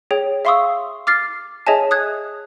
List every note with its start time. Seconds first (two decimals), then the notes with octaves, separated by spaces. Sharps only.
0.11 G#4 C#5 G5
0.45 E5 F5 C6 C#6 D#6 E6
1.07 D6 F6 A6 C7
1.67 G#4 C#5 D#5 E5 G#5 A5
1.91 D#6 F#6 G#6